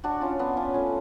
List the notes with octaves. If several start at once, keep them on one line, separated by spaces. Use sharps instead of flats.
D4 F#4
C#4 F4
B3 D4
C#4 F4
A3 C#4